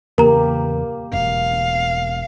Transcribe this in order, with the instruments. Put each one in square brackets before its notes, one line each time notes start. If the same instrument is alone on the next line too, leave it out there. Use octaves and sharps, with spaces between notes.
[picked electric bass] E2 C#3 E3 [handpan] A#3 G4 [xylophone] A#4 A#5
[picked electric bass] E1 [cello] F5